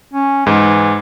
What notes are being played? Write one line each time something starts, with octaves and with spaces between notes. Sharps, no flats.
C#4
G#2 E3